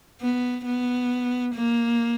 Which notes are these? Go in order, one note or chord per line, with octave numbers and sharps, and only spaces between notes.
B3
B3
A#3